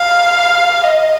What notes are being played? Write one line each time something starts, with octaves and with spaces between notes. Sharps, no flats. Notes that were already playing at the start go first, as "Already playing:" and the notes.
Already playing: F5
D#5